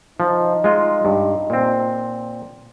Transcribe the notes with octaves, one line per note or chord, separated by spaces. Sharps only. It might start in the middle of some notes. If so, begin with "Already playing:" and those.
F3 D#4
G#3 F4 D#5
G2
A#2 C4